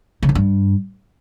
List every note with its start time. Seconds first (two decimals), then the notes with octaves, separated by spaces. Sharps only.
0.23 C#3
0.29 F#2
0.35 G2